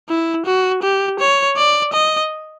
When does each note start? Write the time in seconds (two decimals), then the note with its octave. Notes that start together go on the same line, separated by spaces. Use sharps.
0.09 E4
0.46 F#4
0.83 G4
1.19 C#5
1.57 D5
1.93 D#5